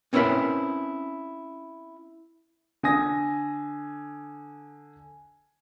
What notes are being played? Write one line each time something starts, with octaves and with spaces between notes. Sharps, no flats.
C4 C#4 E4 A#4 B4 E5
D3 G#5 D#6 A#6